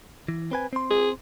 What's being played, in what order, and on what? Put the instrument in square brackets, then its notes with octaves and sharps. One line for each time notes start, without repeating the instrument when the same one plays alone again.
[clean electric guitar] E3
C4 B4 G#5
C4 C6
[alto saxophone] G#4